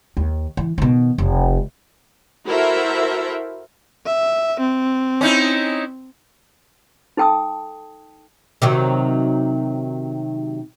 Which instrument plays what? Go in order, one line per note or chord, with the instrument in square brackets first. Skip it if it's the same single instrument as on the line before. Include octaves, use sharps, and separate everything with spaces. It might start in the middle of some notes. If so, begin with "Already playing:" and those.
[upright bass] D#2
E3
B2 D#3
F1
[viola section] E4 F#4 A4 A#4 C5 E5
[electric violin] E5
C4
[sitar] C#4 D#4 E4
[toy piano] D#4 A4 G5 A5 D#6
[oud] C3 D#3 F#3